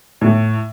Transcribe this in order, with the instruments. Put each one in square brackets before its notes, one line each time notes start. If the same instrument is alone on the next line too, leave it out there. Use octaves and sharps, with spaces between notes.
[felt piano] A2